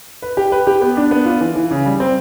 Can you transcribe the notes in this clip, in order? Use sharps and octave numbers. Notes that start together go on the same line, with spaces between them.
B4
G4
B4
G4
B3
D4
B3
F4
E3
E3
C#3
G3
C4